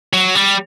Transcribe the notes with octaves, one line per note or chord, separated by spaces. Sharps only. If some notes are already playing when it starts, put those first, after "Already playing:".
F#3
G3